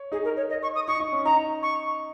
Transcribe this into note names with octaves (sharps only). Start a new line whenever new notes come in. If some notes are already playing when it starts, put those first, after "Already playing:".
Already playing: C#5
D#4 G#4
A#4
C#5
D#5
C#6
D#6
D#4 C#6
D#4
C#4
D#4 A#5
C#6